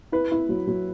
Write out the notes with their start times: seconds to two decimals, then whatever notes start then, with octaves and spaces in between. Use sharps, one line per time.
0.12 E4 B4
0.31 E4
0.49 F#3
0.67 F#3